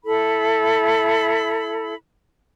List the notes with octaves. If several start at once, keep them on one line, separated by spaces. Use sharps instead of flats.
E4 A4 B5